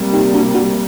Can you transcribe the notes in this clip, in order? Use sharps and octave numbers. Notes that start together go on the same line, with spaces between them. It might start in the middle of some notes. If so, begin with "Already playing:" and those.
Already playing: C3 G3 A#3
D#4 G4
D4 F#4
D4 F#4